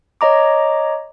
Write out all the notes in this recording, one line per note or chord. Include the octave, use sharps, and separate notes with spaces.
C#5 D#5 A#5 D6